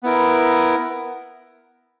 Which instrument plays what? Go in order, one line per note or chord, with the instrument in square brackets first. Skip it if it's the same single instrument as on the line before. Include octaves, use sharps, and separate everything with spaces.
[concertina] B3 E4 A#4